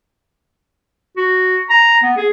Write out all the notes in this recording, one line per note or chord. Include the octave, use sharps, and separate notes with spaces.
F#4
A#5
B3
G#4